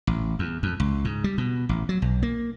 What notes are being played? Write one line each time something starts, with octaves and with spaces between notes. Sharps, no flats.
A1
E2
F2
C#2
G#2
G3
B2
A1
F#3
B1
A#3